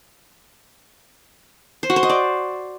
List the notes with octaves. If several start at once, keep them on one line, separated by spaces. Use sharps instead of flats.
C5
F#4
C5
D#5
D5